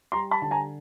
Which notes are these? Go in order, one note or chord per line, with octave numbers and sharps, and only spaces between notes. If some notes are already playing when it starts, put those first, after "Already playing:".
G3 A#5 C6
A5 B5
D3 A5
G#5 A#5